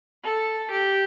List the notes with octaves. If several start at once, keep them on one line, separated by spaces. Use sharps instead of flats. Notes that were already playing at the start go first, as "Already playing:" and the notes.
A4
G4